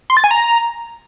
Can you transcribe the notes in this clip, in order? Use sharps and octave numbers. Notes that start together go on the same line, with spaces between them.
C6
A6
G#5
A#5